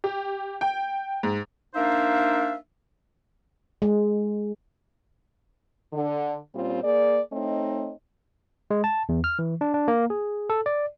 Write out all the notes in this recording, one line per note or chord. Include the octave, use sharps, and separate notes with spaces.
G4
G5
G#2
A#3 D4 D#4 C5 E5 F5
G#3
D3
A#2 G3 C4 C#4 F4
A#3 G#4 D5
A3 C4 D#4 C#5 D#5
G#3
A5
E2
F6
E3
D4
D4
A#3
G#4
A4
D5